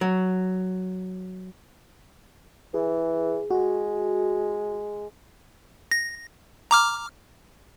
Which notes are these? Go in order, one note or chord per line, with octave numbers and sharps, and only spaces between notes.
F#3
E3 G#4
G#3 F#4
A#6
A#5 D6 F6